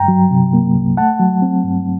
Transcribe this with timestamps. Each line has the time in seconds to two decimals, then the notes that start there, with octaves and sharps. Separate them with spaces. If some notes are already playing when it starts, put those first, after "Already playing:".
Already playing: G2 G5 A#5
0.08 F#3
0.31 C3
0.53 A#3
0.75 C2
0.97 A3 F#5 A5
1.20 F#3
1.42 C4
1.64 G2